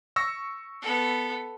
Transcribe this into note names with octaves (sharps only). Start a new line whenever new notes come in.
C#6 E6 A#6
B3 A4